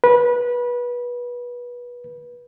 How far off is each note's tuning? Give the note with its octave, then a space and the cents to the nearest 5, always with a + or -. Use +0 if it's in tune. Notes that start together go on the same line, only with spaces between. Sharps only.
B4 -25